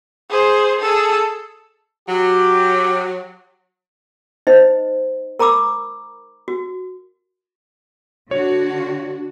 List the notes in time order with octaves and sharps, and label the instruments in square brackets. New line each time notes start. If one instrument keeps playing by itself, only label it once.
[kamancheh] G#4 C5
G#4 A4
[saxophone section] F#3 [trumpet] G4
[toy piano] D#4 C5 D#5
A#4 A#5 B5 D6 E6
F#4
[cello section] D3 D4 F#4 [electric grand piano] C#5